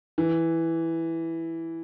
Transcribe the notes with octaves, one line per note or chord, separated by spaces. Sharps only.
E3